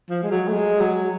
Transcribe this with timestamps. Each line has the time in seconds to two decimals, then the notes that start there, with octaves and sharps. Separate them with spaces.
0.10 F3
0.23 G#3
0.31 F#3
0.48 A3
0.53 G#3
0.80 F#3